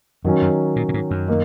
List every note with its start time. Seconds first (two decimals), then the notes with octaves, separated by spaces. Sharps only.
0.25 F#2 D#3 F#3 C#4
0.42 F#2
0.76 A#2
0.89 A#2
0.94 G#2
1.11 F#2
1.28 D#3 A#3